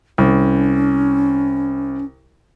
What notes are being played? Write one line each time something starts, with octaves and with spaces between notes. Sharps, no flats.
C2 C#4